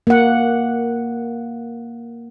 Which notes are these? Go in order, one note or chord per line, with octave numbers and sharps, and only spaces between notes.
A#3 F#5